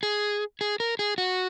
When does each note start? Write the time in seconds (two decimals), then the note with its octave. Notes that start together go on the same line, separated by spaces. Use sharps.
0.03 G#4
0.61 G#4
0.80 A#4
0.99 G#4
1.18 F#4